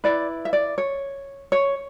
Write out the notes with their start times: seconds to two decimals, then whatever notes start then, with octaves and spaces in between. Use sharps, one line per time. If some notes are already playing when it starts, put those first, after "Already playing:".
0.04 E4 B4 D5
0.45 E5
0.53 D5
0.78 C#5
1.52 C#5